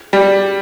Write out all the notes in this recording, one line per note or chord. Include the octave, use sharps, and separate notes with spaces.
G3